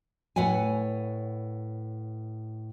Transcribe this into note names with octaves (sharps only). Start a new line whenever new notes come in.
A2 B4 C#5 F#5 G#5